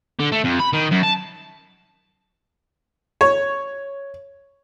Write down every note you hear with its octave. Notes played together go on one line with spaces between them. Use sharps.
D3
A3
F2
B5
D#3
F#2
A5
C#5